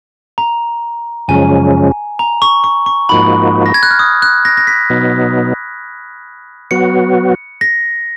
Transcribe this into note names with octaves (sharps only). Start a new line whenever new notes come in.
A#5
F#2 C#3 F3 G#3 C#4 G#5
A#5
C#6
C#6
C#6
G#2 F3 A#3 D#4 F#4 B5
A#6
G#6
F#6
F6
D#6
F#6
A#6
A#6
B6
B2 F#3 B3 D#4
F#3 B3 F#4 C#7
A#6